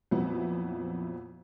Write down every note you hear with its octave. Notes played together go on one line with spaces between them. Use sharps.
F2 A#2 F#3 B3 C4 E4